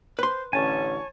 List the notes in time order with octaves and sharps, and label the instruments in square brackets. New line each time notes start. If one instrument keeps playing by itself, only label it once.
[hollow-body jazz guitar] B4 C6 [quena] C5
[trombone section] A1 D3 C#4 [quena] C#5 [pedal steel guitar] G#5 A5